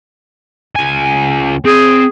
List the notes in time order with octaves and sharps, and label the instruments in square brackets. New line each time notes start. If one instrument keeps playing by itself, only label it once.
[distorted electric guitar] C#2 G#5
[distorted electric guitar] C4 [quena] G#4